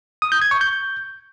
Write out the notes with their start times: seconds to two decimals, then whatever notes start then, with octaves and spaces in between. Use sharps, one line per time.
0.22 D#6
0.32 G6
0.42 G#6
0.51 C#6
0.61 G6